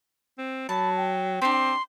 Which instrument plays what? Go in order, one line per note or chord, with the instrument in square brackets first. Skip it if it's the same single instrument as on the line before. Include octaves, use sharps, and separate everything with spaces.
[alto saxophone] C4
[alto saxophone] F#3 [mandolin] A5 [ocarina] B5
[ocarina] G5
[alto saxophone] C4 [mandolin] D4 G4 [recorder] C6